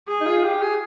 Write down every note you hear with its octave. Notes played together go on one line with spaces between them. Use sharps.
G#4
D#4
F4
G4
G#4